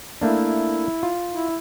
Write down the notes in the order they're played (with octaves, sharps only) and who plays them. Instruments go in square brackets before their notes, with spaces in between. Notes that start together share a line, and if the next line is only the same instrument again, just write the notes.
[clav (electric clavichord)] A3 A#3 D4 [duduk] E4
[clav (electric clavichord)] F4
[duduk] E4